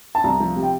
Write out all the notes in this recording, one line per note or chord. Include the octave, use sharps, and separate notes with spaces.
A5
C2 A#5
F3
C3
G5